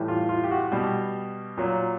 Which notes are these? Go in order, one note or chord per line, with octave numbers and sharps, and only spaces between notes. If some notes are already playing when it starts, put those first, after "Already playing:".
Already playing: A2 E3 G3
F4
F4
G4
F#4
B2 G3
A#2 F#3